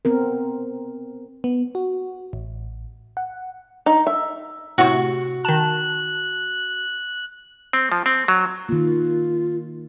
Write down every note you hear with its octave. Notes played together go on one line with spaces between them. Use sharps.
B3 C4 A#4
B3
F#4
A1
F#5
D#4
E5
A2 C3 F#4 C#6
D#3 A5 F#6
C4
F3
C4
F#3
D#3 A#3 F4